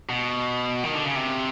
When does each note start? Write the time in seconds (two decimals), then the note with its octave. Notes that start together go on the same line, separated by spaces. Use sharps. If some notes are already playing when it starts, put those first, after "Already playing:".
0.09 B2
0.84 D#3
0.94 D3
1.04 C#3
1.16 C3